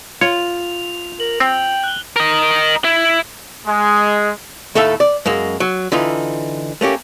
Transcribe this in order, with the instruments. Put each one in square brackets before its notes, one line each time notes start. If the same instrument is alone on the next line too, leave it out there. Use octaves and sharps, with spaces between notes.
[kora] F4 [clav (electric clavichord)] C#5 [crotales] F7
[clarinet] A#4 [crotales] F#7
[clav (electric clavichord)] C4 [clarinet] G5
[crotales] F#6 G7
[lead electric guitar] A#4 D#5
E4
[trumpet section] G#3
[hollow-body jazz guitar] D#2 A2 A3 A4 E5 F5
D5
F#2 G#3 A#3
F#3
D3 E3 D#4 F4
A3 A#3 C#4 G4